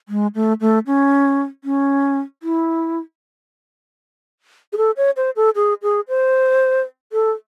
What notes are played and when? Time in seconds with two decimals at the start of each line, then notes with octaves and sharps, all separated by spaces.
0.09 G#3
0.35 A3
0.61 A3
0.86 C#4
1.64 C#4
2.43 E4
4.73 G#4
4.77 A4
4.97 C#5
5.17 C5
5.36 A4
5.56 G#4
5.82 G#4
6.08 C5
7.13 A4